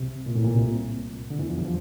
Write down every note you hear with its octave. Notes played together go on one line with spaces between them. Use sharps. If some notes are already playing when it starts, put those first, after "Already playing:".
Already playing: C2 C3
A#2
A2
A#2
C2 C3
D2 D3
E2 E3
F2 F3
G3
F3